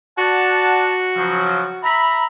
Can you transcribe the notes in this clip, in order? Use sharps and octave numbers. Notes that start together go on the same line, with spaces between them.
F#4 D5 F#5 A5
C#3 F3 F#3
E5 A#5 B5